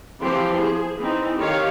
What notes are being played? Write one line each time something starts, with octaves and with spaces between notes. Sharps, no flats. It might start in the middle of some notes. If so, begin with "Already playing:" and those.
E3 F3 C4 G4 C6
G#4 C5
E3 C4 D#4
D#3 G4 C#5 F5